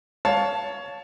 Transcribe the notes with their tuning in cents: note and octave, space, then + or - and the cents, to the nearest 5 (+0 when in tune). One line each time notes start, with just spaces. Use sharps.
C#5 +20 F5 +15 A5 +0